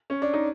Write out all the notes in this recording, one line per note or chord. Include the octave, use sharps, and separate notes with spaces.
C#4
D4
D#4